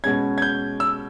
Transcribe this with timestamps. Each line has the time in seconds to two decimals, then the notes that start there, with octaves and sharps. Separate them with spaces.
0.04 B2 G#3 C#4 G#6
0.38 G#6
0.42 G6
0.80 E6